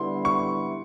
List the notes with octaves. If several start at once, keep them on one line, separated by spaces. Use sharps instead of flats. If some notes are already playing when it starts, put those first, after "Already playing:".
Already playing: D3 G3 B3 E4 C6
C#6